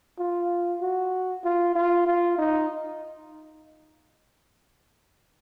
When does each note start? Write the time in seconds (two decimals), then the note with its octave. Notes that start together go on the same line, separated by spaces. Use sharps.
0.19 F4
0.81 F#4
1.44 F4
1.75 F4
2.07 F4
2.38 D#4